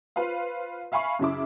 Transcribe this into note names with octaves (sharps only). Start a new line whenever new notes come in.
F4 B4 C5 F5
E5 F5 G#5 B5 C#6
F#2 C#3 E4 D6